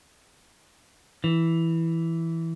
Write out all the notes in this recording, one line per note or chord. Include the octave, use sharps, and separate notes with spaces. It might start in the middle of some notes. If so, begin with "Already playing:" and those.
E3